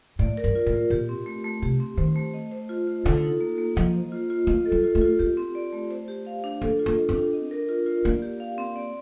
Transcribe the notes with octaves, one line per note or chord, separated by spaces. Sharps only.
A2 D5
A#4
G2
F4
A2
F4
A#2 G4
C4
A3
A3
C3 G4
C4
D#3 C5
A3
D#5
C5
F4
F4
D3 A4
D#4
A#3
A#3
F3 D#5
C5
F4
F4
A#3 D#5
A4
G3
F4
A3
F4
A#3 G4
C4
D5
A3
C5
G4
F5
D4
A#3 A4
F4
A#3
D#5
C4
D4
D#5
A#4
F4
F4
A#3 D5
G4
F5
C4
D5